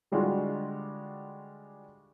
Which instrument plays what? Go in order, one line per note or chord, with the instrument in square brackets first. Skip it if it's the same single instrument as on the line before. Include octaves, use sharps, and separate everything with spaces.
[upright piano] D3 G3 G#3 D4 F4 F#4